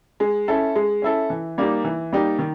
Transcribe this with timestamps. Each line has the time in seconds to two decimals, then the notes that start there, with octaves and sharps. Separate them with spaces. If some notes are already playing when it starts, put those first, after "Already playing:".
0.20 G#3
0.48 C#4 E4 A4
0.76 G#3
1.02 C#4 E4 A4
1.30 E3
1.58 G3 A#3 D#4 G4
1.85 E3
2.13 G3 A#3 D#4 G4
2.39 D#3